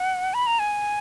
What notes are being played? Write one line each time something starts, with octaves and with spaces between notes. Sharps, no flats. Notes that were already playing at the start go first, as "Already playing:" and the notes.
Already playing: F#5
B5
A#5
G#5